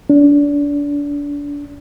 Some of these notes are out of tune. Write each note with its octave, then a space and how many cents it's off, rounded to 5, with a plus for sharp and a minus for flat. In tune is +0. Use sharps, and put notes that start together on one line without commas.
D4 -30